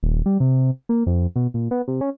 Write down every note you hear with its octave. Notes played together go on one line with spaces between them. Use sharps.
D#1
G3
C3
A#3
F2
B2
A#2
B3
C3
C#4